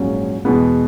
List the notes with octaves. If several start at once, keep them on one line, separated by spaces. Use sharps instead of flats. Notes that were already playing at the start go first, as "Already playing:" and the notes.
Already playing: A#1 G#2 F#3 C#4
E2 B2 G#3 B3